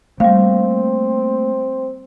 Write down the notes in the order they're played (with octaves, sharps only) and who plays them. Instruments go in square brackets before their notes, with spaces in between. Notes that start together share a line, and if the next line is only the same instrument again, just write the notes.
[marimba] G3 F5 [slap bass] A3 A#3 [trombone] C4